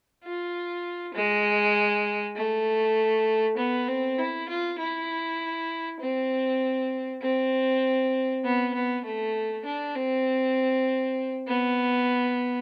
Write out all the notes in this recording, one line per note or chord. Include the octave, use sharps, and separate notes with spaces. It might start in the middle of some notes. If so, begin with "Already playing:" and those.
F4
G#3
A3
B3
C4
E4
F4
E4
C4
C4
B3
B3
A3
D4
C4
B3